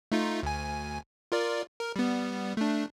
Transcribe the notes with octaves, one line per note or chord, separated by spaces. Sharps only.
A3 D#4 F4
D2 G#5
F4 A#4 D5
A#4
G3 B3
A3 D4